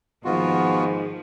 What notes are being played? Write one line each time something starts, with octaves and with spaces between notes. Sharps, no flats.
G#2 D#3 F3 A#3 B3 F4 F#4